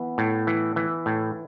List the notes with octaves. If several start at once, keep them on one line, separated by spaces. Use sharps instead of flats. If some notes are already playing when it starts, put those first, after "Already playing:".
Already playing: E3 B3
A2
E3
E3
A2